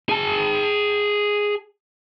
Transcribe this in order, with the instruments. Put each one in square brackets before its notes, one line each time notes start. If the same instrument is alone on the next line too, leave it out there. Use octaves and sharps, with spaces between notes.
[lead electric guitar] G#4 A5